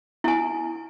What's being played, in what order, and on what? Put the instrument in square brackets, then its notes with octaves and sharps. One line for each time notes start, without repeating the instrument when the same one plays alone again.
[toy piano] E4 G#5